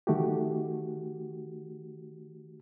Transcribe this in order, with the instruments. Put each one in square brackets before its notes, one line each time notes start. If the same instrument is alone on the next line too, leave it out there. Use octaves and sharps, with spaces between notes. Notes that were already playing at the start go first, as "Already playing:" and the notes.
[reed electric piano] D#3 A3 F#4 G4